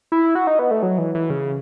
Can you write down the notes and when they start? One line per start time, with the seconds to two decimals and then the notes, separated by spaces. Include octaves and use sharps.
0.12 E4
0.35 F#4
0.47 D#4
0.59 B3
0.71 A3
0.83 F#3
0.98 E3
1.14 E3
1.30 C#3